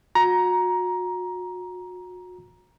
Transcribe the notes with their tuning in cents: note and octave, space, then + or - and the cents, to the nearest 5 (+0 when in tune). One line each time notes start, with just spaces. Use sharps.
F#4 -35 A#5 +15